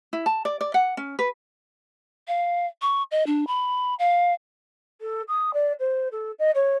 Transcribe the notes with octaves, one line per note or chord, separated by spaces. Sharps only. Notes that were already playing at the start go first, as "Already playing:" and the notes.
E4
A5
D5
D5
F#5
C#4
B4
F5
C#6
D#5
D4
B5
F5
A4
D#6
D5
C5
A4
D#5
C#5